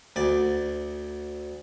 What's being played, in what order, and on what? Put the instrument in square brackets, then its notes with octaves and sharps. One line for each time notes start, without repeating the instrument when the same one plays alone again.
[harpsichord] D2 D5